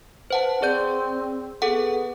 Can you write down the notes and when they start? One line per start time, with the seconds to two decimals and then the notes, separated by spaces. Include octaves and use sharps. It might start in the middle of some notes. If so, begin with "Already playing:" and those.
0.31 B4 C5 F#5 A5
0.62 C4 G#4 D5 G6
1.62 B3 G#4 A4 F#5